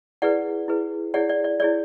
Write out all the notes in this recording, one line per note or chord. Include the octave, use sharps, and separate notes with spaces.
E4 G#4 B4 D5 F#5
E4 G#4 B4
E4 G#4 C#5 D5 F#5
D5
D5
E4 G#4 C#5 D5